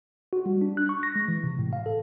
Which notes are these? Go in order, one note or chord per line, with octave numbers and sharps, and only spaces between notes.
F#4
G3
D4
F#6
C#6
A#6
G#3
E3
C3
A2
F5
A4